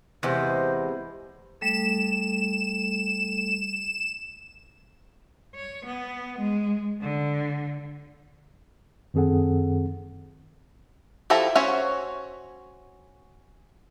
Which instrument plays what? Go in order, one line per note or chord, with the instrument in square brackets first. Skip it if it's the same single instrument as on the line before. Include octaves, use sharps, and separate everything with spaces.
[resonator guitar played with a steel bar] E2 [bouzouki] C3 G#3 B4 [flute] C5
[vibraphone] G3 A3 A4 [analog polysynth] E7
[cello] C#5
B3
G#3
D3
[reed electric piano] F#2 D#3 C4 G#4 A4 F#5
[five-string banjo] F3 E4 G4 A4 A#5
C#4 F#4 C5 C#5 E5